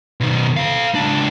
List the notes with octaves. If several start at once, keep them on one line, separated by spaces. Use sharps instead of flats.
B2 D#3
A4 F5
C#2 D4